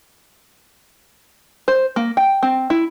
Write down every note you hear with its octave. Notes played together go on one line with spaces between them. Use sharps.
C5
A#3
G5
C4
E4